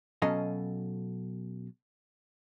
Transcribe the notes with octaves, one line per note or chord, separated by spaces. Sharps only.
B2 F#3 C#4 A4 D#5 F5